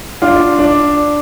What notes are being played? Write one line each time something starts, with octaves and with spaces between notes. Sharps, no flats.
D4 F4
D4